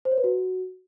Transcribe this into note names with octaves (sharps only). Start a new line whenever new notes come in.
C5
C#5
B4
F#4